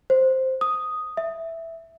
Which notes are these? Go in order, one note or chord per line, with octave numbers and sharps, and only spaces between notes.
C5
D#6
E5